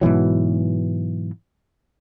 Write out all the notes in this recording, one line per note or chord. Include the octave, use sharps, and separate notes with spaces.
G#2 B2 E3 F#3